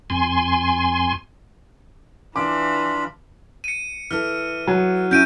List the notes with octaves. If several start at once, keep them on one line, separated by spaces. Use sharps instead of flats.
F2 G#5 C6
E3 D4 F4 B5 D6
C#7 D#7
E3 A4 F6
F#3
C#4 E4 E5 G6 D7 D#7